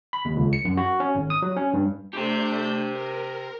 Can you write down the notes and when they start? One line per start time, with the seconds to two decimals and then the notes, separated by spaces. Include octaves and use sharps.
0.13 B5
0.25 D#2
0.36 C#2
0.53 C#7
0.65 F#2
0.77 F#4
1.00 C#4
1.15 G#1
1.30 D#6
1.42 F#3
1.56 C#4
1.74 G2
2.13 A3 D4 G4 C5 G6
2.91 A#4